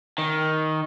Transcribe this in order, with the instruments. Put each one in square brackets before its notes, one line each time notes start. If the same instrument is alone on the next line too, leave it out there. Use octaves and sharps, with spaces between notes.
[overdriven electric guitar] D#3